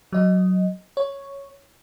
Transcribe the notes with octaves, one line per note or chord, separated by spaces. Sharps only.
F#3 D#5
C#5